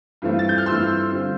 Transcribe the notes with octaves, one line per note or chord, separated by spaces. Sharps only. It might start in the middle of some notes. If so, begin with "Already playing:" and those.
G2 E3 A3 C4 F4
A6
G6
F6
G2 E3 A3 C4 F4 C6 E6
D3 G3 C4 F4